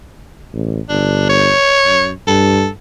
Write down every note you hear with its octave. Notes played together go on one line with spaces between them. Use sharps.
A1
G1 D4
C#5
F#2
G2 A4